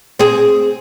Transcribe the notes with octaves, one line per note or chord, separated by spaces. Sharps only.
C4 G#4